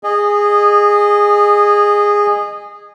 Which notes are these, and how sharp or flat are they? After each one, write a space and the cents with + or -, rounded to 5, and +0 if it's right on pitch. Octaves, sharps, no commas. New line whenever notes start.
G#4 -15 D#5 -25